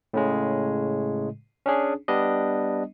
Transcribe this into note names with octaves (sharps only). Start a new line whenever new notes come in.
A2 C#3 G#3
C#4 D4 G#4
G3 B3 D4 D#5